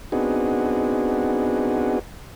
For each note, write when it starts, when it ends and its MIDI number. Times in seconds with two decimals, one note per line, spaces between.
0.12 1.99 59
0.12 1.99 60
0.12 1.99 62
0.12 1.99 63
0.12 1.99 66
0.12 1.99 68